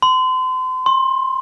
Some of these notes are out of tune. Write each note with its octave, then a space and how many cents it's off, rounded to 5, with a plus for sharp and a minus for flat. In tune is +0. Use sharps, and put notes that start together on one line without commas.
C6 -35
C6 +25